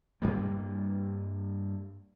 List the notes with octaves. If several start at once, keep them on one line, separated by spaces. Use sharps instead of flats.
G2 G3 A#3